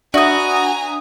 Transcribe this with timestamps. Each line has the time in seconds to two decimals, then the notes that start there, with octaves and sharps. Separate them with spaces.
0.14 D4 F#4 B4 E5 G#5 A#5 D#6